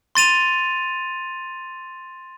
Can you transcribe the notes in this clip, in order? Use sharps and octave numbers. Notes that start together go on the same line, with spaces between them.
C6 A6 D#7 F7